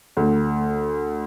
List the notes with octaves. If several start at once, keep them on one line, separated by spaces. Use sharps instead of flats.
D2